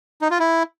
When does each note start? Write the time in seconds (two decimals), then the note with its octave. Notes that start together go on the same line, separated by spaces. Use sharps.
0.22 D#4
0.31 F4
0.40 E4